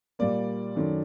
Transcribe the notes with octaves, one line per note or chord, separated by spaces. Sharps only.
A#2 G3 A#3 D5
F#2 D#3 F#3 A3